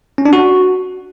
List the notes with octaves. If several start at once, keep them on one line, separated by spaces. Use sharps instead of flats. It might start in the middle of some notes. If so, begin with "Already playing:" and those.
C#4
D4
F#4